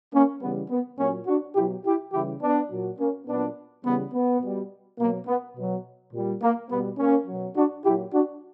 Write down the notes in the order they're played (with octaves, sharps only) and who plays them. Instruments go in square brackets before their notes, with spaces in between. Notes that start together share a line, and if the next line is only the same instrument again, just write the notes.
[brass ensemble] A#3 C#4
C#3 E3 G3 B3
B3
A#2 F#3 A#3 C#4
D4 F#4
B2 E4 G4
F#3
E4 G4
C#3 E3 G3 E4 G4
B3 D4
A#2 F#3
A#3 C#4
A#2 F#3 B3 D4
C#3 E3 G3 B3
B3
B2 G3
B2 F#3 A#3
B3
B2 F#3
A#2 G3
A#3
B2 G3 B3
A#3 C#4
B2 F#3
D4 F#4
A#2 E4 G4
F#3
D4 F#4